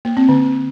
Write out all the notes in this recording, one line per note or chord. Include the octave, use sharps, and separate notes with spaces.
A#3
C4
D3